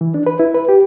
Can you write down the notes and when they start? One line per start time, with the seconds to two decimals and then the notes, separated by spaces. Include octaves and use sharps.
0.01 E3
0.14 D4
0.26 B4
0.39 E4
0.54 B4
0.69 G4